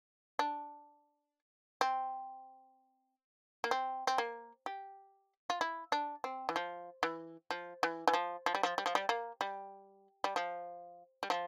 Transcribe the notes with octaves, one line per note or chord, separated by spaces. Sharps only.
D4
C4
A#3
C4
C4
A#3
G4
F4
E4
D4
C4
E3
F3
E3
F3
E3
E3
F3
F3
G3
F3
G3
F3
G3
A#3
G3
G3
F3
G3
F3